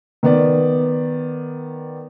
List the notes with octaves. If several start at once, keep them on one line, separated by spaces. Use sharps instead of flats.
D#3 B3 D5